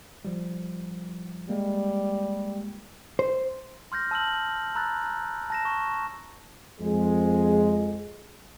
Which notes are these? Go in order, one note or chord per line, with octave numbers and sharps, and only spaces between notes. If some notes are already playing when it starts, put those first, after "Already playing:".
F3 G3
G3 G#3 A#3
C5
C6 F6 G6 A#6
A5 E6 F6 F#7
A#5 B5 E6 F#6 A6
A5 A#6 E7
C#6
F2 G#3